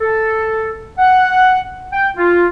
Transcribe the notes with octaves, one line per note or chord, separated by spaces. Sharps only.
A4
F#5
G5
F4